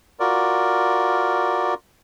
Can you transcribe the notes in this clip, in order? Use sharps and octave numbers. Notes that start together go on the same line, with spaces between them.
F4 F#4 A#4 D5